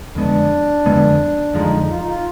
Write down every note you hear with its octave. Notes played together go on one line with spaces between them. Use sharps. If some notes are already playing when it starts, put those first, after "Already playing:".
F2 D3 G#3 B3 D4
F2 D3 G#3 B3
F2 D3 F3 G#3 D#4
F4
D#4
F4